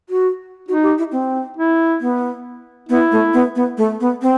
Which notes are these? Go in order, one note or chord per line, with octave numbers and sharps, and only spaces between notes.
F#4
D#4 F#4
G4
E4
C4
E4
B3
B3 E4
A3
B3
B3
A3
B3
C4